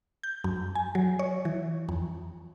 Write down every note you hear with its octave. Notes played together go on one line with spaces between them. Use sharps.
G6
F#2
G#5
F#3
C#5
E3
F2